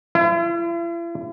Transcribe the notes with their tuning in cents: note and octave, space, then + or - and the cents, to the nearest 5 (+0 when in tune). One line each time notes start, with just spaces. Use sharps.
E4 +45